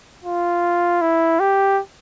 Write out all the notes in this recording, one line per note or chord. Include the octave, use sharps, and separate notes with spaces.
F4
E4
G4